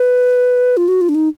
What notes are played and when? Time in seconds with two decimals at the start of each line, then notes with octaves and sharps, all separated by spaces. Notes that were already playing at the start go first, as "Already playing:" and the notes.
Already playing: B4
0.77 F4
0.88 F#4
1.01 F4
1.09 D4
1.15 D#4